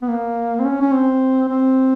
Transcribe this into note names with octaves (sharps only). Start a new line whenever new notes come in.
B3
A#3
C4
C#4
C#4
C4
C4